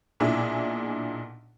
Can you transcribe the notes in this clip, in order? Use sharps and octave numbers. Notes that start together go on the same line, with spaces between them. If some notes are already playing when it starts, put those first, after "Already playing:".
B1 A#2 D4 E4 G#4